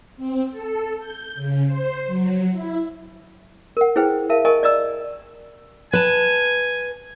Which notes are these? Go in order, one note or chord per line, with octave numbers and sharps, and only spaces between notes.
C4
A4
G6
C#3
C5
F#3
E4
A#4 F#5
E4 G#4 B4 C5 G5
A#4 E5 F5 A5
A#4 D#5 G#5 A5 C#6
D5 D#5 A#5 E6
B4 G#5 A5